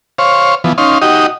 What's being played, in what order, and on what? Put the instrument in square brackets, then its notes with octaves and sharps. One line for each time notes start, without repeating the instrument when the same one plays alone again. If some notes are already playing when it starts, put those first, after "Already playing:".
[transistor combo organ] C5 C#5 F5
E3 F3 B3
C#4 D#4 F5 C6
D#4 F#4 G4 D#5